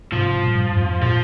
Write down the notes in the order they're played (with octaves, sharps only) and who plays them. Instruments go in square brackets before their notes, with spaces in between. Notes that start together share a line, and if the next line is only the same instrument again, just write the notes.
[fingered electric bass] G#2 C3 [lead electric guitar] F3
[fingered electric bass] G2 A#2
F2 G#2
[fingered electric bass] A#2 [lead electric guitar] F3